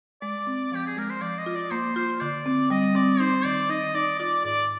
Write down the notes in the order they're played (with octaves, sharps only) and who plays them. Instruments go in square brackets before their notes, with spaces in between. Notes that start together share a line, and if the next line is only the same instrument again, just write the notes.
[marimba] G#3 [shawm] D5
[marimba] C4
[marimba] F3 [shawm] G4
[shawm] G#4
[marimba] G#3 [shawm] A#4
[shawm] C5
[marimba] F3 [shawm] D5
[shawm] D#5
[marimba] F4
[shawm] D5
[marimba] A#3 [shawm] C5
[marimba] F4 [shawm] C5
[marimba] D3 [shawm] D5
[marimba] C4
[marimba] G3 [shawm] D#5
[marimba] C4 [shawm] D5
[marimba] D#4 [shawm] C5
[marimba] D#3 [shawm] D5
[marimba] D#4 [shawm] D#5
[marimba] D#4 [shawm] D5
[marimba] F4 [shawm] D5
[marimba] G#2 [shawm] D5